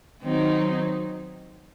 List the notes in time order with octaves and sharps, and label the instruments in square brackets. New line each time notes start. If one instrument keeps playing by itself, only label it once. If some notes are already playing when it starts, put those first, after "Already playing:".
[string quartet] D#3 F#3 C4 D#4